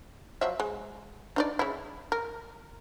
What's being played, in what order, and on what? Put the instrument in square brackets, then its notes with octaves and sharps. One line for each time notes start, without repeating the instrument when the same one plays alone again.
[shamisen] F3 F#3 E5
G#3
D4 D#4 D5
C#3 E4
A#4